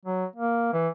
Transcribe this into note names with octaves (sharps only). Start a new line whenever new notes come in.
F#3
A#3
E3